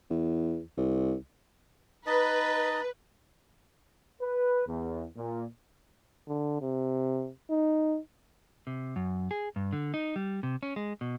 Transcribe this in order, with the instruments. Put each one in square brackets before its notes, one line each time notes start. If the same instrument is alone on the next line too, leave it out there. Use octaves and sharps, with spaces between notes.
[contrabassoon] E2
C2
[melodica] D#4 D#5 A5 [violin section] B4
[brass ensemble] B4
E2
A#2
[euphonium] D3
C3
D#4
[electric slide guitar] C3
F#2
G#4
G2
D3
D#4
G3
C3
C#4
G#3
B2